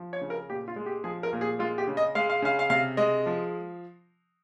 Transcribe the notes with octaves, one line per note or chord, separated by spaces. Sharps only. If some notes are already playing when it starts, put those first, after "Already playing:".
Already playing: F3
C#5
C#3
A#4
A#2 G4
F4
G#3
G4
F3 G#4
A#4
A#2
G#4
G#3 F4
G4
C#3
D#5
G#3 F5
F5
C#3 F5
F5
C3 F5
G#3 D#5
F3